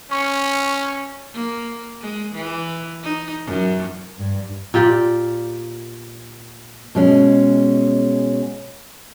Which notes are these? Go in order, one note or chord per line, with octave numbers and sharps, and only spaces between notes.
C#4 C#6
A#3
G#3
E3
D#4
F#2
G2
A#2 F4 G4 D5
B2 G#3 C#4